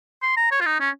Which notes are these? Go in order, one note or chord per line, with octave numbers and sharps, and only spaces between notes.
C6
A#5
C#5
F4
D#4
C#4